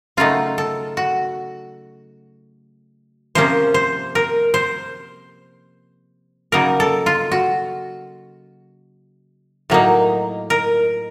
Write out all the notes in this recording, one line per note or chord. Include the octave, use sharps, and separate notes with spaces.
C#3 F#3 A3 D#4 F4
A4
F#4
C3 F3 A#3 C#4 C5
C5
A#4
C5
C#3 F#3 A#3 D#4 A#4
A4
F4
F#4
A2 F#3 A#3 D#4
A#4